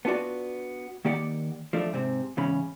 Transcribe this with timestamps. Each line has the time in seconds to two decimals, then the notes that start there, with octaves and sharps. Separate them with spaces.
0.05 B3 D4 F4 F#4 D5
1.05 D#3 A#3 G4 D5 F#5
1.73 F3 A3 D4
1.93 G#2 C3 C4
2.37 E2 G#2 C#3 C#4 B5